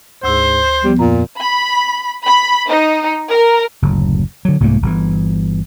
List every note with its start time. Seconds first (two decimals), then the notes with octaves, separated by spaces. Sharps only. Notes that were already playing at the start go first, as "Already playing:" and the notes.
0.23 D2 G#2 C5 E6
0.84 F3 G3 B3
0.99 F2 A#2 A#5
1.39 B5
2.24 B5
2.69 D#4
3.30 A#4
3.82 F#1 D2 A2
4.45 D3 F#3
4.60 C2 G#2 A3 A#3
4.82 G1 E3